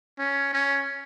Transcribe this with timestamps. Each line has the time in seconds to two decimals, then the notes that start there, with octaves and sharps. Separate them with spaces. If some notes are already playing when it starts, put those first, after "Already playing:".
0.19 C#4
0.53 C#4